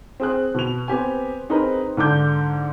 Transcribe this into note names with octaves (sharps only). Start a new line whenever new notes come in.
C4 G#4 F#6
B2 F7
B3 C4 G4 G#5
C4 D#4 G#4 A#4 B4
G#2 D3 D6 G6